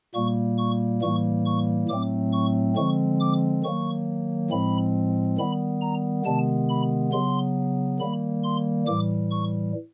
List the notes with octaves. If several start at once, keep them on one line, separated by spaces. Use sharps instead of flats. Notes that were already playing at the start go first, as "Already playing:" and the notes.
A#2 G3 A#3 C#6
C#6
A2 E3 G3 A#3 C#6
C#6
A2 F#3 A3 C4 D6
C#6
D3 F3 G#3 C4 C#6
D6
D#3 F#3 A#3 C#6
A2 F3 G#3 C4 B5
D#3 G3 B3 B5
A#5
C3 D#3 G#3 B3 A5
B5
C#3 F#3 B3 C6
D#3 G3 A#3 B5
C6
A2 E3 G3 D6
C#6